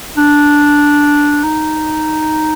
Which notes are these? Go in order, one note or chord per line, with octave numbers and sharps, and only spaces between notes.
D4
D#4